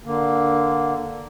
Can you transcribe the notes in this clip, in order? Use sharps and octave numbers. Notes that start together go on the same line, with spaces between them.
D3 A#3